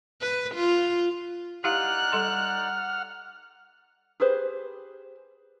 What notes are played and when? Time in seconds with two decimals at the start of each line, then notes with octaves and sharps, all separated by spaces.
0.21 B4
0.55 F4
1.64 D#4 E4 G4 D5 F5 F#5 F6 F#6
2.12 G3 A4 C6
4.20 G4 G#4 B4 C5